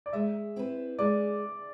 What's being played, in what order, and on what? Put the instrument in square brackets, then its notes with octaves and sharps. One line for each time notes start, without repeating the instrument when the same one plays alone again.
[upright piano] D5
[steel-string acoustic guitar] G#3 [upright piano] E5
[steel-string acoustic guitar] C4 E4 B4
[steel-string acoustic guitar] G#3 [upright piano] D5